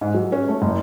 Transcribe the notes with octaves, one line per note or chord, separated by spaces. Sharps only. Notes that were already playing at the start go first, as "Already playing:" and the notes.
G#2
F#3
C#4
A3
F#1